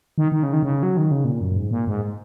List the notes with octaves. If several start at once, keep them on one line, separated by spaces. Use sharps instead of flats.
D#3
D#3
C#3
D#3
C#3
F#3
D#3
C#3
A#2
F#2
G#2
A#2
G#2